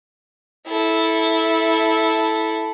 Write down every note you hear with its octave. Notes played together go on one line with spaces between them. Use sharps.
E4 A4